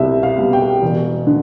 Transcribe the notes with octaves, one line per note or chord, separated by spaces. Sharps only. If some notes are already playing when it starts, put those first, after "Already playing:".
Already playing: C2 B2 G3 E5
F5
B2 G3
G5
E1
D3